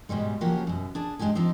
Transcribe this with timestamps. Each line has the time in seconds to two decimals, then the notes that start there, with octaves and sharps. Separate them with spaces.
0.09 G#2 B2 G3 G#3
0.41 C#3 F3 F#3 A#3 G4 A#4
0.67 F#2 B2
0.95 D4 G#4 A5
1.19 G#2 G#3 D4 G4 G#5
1.35 F3 C4 D4 D#4